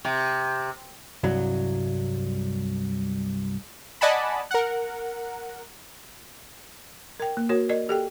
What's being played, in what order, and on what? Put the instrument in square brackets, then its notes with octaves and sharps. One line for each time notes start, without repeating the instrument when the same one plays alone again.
[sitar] C3
[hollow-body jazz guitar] C2 G2 F#3
[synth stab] D5 D#5 F#5 G#5 A5 B5
A#4 F#5
[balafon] A#4 G5
A#3
F#4 A#4 C#5
A#4 D5 D#5
G4 A4 G5